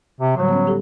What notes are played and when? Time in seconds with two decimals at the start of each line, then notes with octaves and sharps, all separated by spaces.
0.20 C3
0.37 A2 D3 F#3 G3
0.49 B3 C#4
0.66 G3 G4 A4